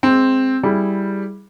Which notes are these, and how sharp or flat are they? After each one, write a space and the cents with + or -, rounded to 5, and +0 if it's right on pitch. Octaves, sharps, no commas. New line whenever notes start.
G#3 +10 C4 +0
G3 +0 E4 +0 G#4 +0